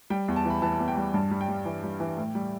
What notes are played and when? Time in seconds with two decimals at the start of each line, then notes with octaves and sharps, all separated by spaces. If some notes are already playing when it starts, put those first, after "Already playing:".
0.10 G3 G5
0.28 E2
0.36 A5
0.45 E3 B5
0.62 E3 A5
0.75 A5
0.80 E2
0.88 G5
0.97 G3
1.14 G2 A5
1.31 G3
1.41 G5
1.48 G3
1.65 E3
1.83 G3
2.00 E3
2.17 A2
2.35 G3